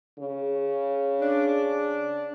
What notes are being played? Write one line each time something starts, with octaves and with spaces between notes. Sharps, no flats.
C#3
D4